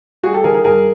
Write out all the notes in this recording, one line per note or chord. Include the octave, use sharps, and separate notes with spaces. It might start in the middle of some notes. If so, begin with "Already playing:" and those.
G3 F#4 G#4
G4 A4
D#3 G#4 A#4
G#4 A#4
G2 G#4 A#4